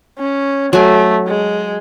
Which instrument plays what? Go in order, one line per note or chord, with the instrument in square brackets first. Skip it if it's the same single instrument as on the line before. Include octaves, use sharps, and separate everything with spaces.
[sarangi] C#4
[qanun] F#3 G#5 [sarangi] A3
[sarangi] G#3